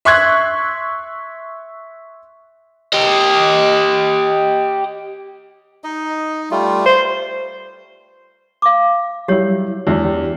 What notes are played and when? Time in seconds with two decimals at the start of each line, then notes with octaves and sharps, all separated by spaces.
0.05 E5 C6 C#6 F#6 G#6
2.93 G4 D#5
5.84 D#4 D#5
6.51 G3 A3 F4
6.86 C5
8.62 F5 D6
9.28 F#3 G3 E4 G4 C#5
9.87 E2 G#3 D4 F#4
10.05 G4